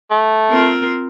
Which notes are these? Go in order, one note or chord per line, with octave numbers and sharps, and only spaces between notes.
A3
C4 F4 A#4